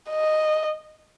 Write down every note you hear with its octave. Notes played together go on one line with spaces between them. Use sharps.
D#5